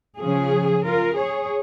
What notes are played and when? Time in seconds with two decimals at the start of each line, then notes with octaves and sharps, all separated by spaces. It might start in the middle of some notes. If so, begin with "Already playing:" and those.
0.19 C#3 F3 C#4 G#4
0.84 F4 A#4
1.16 G#4 C#5